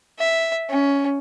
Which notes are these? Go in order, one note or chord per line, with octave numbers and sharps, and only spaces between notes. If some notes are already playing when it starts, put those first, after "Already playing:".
E5
C#4